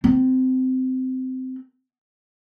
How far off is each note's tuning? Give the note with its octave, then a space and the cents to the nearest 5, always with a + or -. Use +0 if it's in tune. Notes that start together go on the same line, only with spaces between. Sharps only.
C4 -20